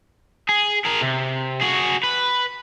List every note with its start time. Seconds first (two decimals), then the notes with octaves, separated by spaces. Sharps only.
0.49 G#4
0.85 G#4 A#4
1.01 C3
1.61 F#4 G#4
2.04 B4